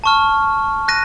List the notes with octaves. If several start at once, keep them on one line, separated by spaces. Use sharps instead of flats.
A5 C#6 F6
F#6 A#6 D#7